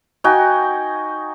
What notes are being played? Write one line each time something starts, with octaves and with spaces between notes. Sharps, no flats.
D#4 F#4 G5 G#5